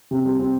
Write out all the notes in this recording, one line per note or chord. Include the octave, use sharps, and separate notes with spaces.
C3
G3
C4